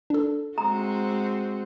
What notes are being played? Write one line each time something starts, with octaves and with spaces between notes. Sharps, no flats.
D4 A4
G#3 C4 F#4 A#5